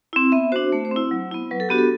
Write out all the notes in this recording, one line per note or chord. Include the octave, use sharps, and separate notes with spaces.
C4 E4
B3 E5
D4 F#4 C5
A3 C5
C5
C4 E4
F#3
B3 E4
F#3 B4
A4
B3 D4 F#4 G4
A4